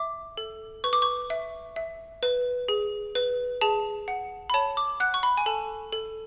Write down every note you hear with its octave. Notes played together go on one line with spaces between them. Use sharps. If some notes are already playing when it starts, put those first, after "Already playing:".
Already playing: E5 D6
A4
B4 C#6
D6
C#6
E5
E5
B4
G#4
B4
G#4 A5
F#5
B5
C#5 A5
D6
F#5 F#6
C#6
B5
G#5
A4 A5
A4